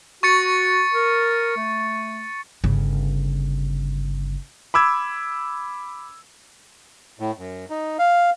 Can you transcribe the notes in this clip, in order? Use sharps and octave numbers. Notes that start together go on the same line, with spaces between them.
F#4 C#6 A6 C#7
A#4
A3
G1 C#3
B5 D6 E6 G#6
A2
F#2
D#4
F5